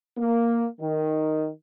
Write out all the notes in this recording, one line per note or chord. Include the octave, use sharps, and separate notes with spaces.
A#3
D#3